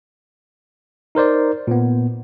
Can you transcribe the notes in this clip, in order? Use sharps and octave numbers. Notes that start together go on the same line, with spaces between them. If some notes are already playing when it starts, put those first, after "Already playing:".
D#4 A#4 C5 D5
A#2 B3